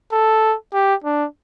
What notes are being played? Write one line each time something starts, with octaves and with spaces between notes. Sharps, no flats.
A4
G4
D4